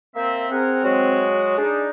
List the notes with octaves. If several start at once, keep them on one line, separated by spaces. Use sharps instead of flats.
A#3 C4 E5
C4 G#4 A#4 F#5
F#3 G#3 F#4
D4 D#4 G#4